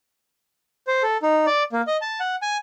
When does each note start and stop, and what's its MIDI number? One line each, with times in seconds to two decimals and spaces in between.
0.87 1.03 72
1.03 1.17 69
1.22 1.46 63
1.46 1.63 74
1.72 1.82 58
1.87 1.97 75
2.01 2.20 81
2.20 2.36 78
2.42 2.57 80